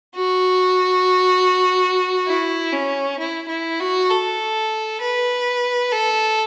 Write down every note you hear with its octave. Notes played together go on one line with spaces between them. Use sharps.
F#4
E4
C#4
E4
E4
F#4
A4
B4
A4